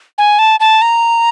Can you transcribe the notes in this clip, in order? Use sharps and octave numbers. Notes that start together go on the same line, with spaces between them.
G#5
A5
A5
A#5